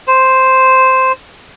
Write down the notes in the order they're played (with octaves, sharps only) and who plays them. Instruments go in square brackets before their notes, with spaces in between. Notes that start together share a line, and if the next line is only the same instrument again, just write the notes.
[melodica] C5